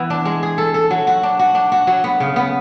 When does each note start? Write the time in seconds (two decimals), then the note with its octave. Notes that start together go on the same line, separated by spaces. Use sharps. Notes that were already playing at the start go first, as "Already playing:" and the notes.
Already playing: E3 B3
0.10 D4
0.25 G#3
0.43 G#4
0.58 A4
0.74 A4
0.91 F#3
1.07 F#4
1.23 D4
1.39 F#4
1.55 D4
1.72 F#4
1.87 F#3
2.04 B3
2.20 C#3
2.36 B3